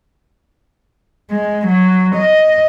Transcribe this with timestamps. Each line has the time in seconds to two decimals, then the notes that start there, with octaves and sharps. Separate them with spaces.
1.31 G#3
1.67 F#3
2.16 D#5